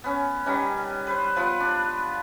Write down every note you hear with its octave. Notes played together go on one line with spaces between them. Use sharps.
B3 C#4
D#3 G3 B3 C#4
B4 C5
F3 B3
D4